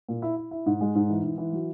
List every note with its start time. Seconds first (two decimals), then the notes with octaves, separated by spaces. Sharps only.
0.09 A#2
0.22 E4
0.36 E4
0.51 E4
0.66 G#2
0.81 G#3
0.95 G#2
1.09 E3
1.24 G#2
1.38 E3
1.53 F#3